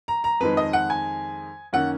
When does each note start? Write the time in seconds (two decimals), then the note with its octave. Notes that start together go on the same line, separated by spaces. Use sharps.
0.08 A#5
0.24 A#5
0.40 F2 D#3 G#3 B4
0.57 D#5
0.73 F#5
0.90 G#5
1.73 F#2 D#3 A#3 C#4 F#5